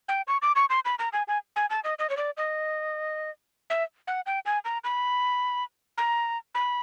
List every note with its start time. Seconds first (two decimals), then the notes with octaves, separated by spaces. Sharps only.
0.08 G5
0.27 C#6
0.42 D6
0.56 C#6
0.70 C6
0.85 B5
0.99 A#5
1.13 G#5
1.28 G#5
1.56 G#5
1.70 A5
1.84 D#5
1.99 D#5
2.10 C#5
2.17 D5
2.37 D#5
3.70 E5
4.07 F#5
4.26 G5
4.46 G#5
4.65 A#5
4.84 B5
5.98 A#5
6.55 B5